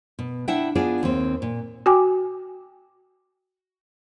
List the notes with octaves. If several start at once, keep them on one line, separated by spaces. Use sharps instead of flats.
B2
D4 E4 E5 F#5 G5
B3 D4 F4 G#4 D5
D#2 C4
A#2
F#4 G5 G#5 D6